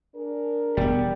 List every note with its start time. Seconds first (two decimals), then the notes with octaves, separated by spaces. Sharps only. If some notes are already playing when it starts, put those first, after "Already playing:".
0.15 D4 G#4 A#4
0.77 E1 G3 B3